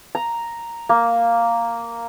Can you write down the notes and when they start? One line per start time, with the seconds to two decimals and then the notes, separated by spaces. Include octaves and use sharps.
0.15 A#5
0.89 A#3